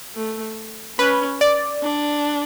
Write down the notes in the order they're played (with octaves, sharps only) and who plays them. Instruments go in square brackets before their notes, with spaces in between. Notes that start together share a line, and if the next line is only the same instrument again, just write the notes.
[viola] A3
[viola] C#4 [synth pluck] B4
[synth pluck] D5
[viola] D4